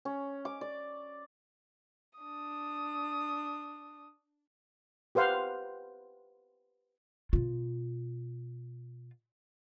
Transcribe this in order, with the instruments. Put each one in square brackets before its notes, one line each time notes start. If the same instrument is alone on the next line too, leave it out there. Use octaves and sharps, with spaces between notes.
[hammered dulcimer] C#4
D6
D5
[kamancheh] D4 D#6
[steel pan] G4 B4 C5 F5 F#5
[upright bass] B2 F4